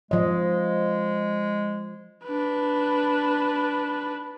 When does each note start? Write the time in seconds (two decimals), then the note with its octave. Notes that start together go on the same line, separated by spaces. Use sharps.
0.11 F3 G#3 D#5
2.24 D4 B4